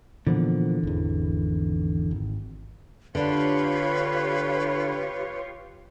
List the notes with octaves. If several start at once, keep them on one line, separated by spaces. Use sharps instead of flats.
A#2 D3 E3 F3 B3
G#1 E2
G#1
D3 D4 F4 G4 B4 C#5